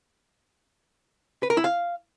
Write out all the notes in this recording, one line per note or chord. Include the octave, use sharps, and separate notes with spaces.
B4
A#4
E4
F5